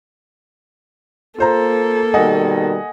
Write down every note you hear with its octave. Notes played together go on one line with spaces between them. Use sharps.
A#3 F4 A4 C5 A#5
B2 D#3 G3 D#5 F#5 G#5